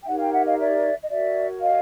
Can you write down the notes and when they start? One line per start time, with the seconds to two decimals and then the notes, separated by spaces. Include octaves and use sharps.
0.02 G5
0.06 D#4 G4 A#4 C#5 E5 F#5
0.19 F5 G5
0.32 E5 F#5
0.44 D#5 F5
0.58 D5 E5
1.03 D#5
1.09 F#4 A#4 C#5 D5 E5
1.61 D#5 F5